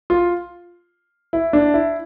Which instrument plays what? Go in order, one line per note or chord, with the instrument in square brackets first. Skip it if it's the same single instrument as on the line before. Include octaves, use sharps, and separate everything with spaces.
[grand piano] F4
E4
D4
E4